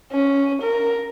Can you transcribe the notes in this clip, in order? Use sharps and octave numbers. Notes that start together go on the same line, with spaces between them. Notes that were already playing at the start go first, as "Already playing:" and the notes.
C#4
A#4